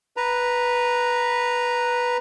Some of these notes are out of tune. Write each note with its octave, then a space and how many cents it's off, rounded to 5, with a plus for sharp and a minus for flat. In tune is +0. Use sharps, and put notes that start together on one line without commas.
B4 -5 A#5 +0